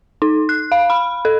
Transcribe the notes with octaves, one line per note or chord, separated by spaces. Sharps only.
D#4
F#6
F5
B5
A4